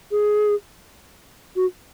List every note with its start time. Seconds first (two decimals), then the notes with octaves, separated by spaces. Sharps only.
0.11 G#4
1.56 F#4